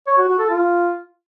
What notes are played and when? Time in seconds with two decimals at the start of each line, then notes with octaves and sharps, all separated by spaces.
0.07 C#5
0.18 F#4
0.28 F#4
0.39 A4
0.49 F4